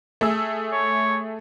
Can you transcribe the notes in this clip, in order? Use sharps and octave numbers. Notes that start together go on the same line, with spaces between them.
A3 G#4 E6
C#5